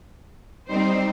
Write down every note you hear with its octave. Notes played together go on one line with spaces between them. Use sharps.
G3 C4 D#4 C5